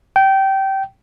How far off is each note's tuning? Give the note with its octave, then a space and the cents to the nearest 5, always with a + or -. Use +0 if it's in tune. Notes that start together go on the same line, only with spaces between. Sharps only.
G5 -20